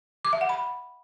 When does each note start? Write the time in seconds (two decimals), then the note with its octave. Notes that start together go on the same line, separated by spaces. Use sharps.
0.25 D6
0.33 E5
0.41 F#5
0.49 B5